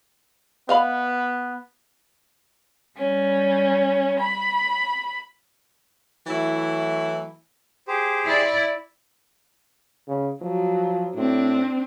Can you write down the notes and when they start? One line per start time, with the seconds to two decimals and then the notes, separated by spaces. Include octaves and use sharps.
0.69 B3 D#5 F5 B5
2.97 G3 C#4
4.20 B5
6.27 E3 F#3 A3 E4
7.88 G4 G#4 C5
8.25 E4 D5
10.08 C#3
10.42 F3 F#3
11.15 A2 C4 D4